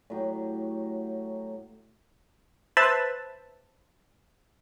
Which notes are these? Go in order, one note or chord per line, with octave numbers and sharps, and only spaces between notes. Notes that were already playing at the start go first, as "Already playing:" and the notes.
A2 F#3 G4
B4 C5 E5 A5